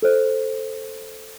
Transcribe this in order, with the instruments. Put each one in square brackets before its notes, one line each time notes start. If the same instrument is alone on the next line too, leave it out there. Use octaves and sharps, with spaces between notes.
[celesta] A4 C5